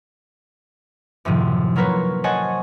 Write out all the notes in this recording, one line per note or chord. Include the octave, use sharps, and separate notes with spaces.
F#2 A2 C3 D#3 F3
F#3 A#3 F4 A#4 B4 C#5
C5 C#5 D#5 F#5 G#5 A5